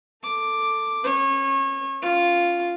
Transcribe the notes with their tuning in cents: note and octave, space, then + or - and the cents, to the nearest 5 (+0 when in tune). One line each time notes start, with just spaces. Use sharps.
A4 +15 D6 +5
C#4 -35 C#5 -30
C#4 +0 F4 +0